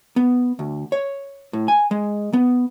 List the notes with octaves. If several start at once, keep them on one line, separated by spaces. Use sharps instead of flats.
B3
D2
C#5
A2
G#5
G#3
B3